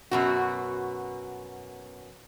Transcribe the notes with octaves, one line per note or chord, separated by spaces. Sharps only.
F#2 B2 F#4